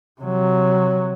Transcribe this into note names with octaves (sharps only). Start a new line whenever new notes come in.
C3 F#3